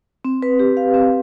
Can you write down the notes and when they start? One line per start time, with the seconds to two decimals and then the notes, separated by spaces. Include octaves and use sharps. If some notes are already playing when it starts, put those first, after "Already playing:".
0.25 C4
0.42 B4
0.60 G4
0.77 F5
0.94 C4